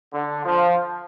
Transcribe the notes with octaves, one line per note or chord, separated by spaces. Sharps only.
D3
F3